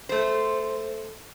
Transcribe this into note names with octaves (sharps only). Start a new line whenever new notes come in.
A3 C5